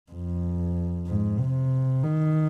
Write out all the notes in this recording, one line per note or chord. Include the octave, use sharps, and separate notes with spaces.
F2
G#2
C3
D#3